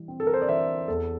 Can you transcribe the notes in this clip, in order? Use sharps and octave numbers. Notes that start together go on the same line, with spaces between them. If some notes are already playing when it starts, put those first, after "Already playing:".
Already playing: E3 G3
C4
A4
A#4
C5
D5
E3 C5 E5
E2 A4